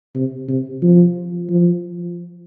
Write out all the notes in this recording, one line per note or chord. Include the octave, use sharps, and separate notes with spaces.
C3
C3
F3
F3